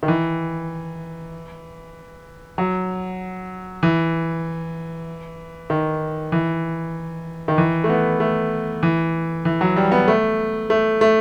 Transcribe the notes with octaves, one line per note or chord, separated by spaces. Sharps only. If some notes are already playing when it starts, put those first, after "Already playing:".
D#3
E3
F#3
E3
D#3
E3
D#3
E3
A3
B3
A3
E3
E3
F#3
G3
B3
A3
A3
A3